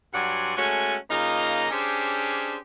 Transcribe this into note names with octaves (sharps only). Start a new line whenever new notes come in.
G2 F#3 D5 F#5 G#5 C6
G#3 A3 C#4 F#4 A4 G#5
C#3 A#3 D#4 F4 D#5 A#5
C#4 D4 G4 G#4 C5